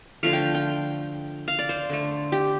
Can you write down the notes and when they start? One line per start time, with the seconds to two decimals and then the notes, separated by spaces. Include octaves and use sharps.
0.23 D3 F3 A3 F5
0.33 G5
0.54 G5
1.48 F5
1.59 D5
1.69 C5
1.90 D3 A3
2.32 G4